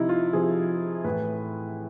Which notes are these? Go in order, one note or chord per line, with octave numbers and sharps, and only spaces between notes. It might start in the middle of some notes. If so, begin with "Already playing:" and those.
Already playing: C3 F3 D#4 E4
F4
C3 F3 G#4
A2 E3 B4